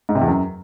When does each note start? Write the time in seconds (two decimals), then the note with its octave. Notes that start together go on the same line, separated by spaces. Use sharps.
0.09 G#2
0.15 C3
0.22 E2
0.28 F#2